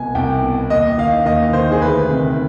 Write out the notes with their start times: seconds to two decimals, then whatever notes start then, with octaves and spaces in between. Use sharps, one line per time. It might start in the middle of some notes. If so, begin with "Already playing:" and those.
Already playing: C2 B2 G#5
0.15 C2 G5
0.43 B2
0.70 D#2 D#5
0.98 D#3 F5
1.25 D#2 D#5
1.53 D#3 C5
1.71 G#4
1.82 D2 B4
2.09 C3 D#3